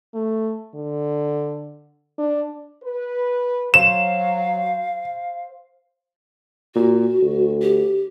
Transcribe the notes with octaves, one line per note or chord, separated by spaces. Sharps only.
A3
D3
D4
B4
F#3 C5 F5 E7
A#2 F#4
D2
G4